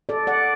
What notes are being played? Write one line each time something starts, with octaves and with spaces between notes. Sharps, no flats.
A4 D5
D5 F#5